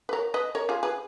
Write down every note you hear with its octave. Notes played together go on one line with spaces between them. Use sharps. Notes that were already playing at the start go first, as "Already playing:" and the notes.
B4
A#4 C#5
B4 D#5
A#4 C#5
F4 G#4
G#4 B4